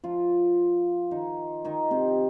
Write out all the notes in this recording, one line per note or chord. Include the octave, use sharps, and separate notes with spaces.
F3 F4
D#3 D#4
D#3 D#4
C3 C4